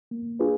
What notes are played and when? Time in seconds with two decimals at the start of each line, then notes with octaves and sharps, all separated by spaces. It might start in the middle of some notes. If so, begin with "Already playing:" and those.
0.11 A#3
0.40 D4 F4 G#4 B4